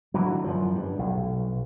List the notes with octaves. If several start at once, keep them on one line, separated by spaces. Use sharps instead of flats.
D3 E3 F#3
F#2 F3
G2
B1